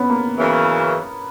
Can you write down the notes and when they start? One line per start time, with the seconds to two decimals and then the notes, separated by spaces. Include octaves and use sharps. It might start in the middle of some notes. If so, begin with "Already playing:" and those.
Already playing: B3 C#4
0.10 A#3
0.38 F#2 C#3 E3